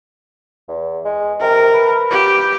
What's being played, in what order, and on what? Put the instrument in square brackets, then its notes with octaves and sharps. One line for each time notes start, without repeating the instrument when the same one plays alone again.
[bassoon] E2
G#3
[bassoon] C3 [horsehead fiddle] A#4
[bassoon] B4
[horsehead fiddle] G4